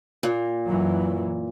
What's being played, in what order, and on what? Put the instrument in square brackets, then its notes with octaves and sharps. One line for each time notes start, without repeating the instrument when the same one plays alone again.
[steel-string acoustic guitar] A#2
[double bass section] F#2 E3 F#3